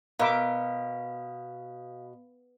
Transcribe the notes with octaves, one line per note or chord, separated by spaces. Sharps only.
B2 A#4 E5 F5 B5 D6